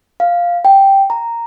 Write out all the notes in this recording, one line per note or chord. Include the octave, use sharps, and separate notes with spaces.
F5
G5
A#5